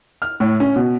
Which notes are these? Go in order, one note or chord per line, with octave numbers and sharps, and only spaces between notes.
F6
A2
C#4
B2